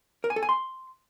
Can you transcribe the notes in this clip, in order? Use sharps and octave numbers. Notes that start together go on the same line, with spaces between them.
A#4
G#5
A4
G#5
C6